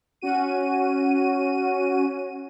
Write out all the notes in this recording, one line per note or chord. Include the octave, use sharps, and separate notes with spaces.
C#4 F#4 D#7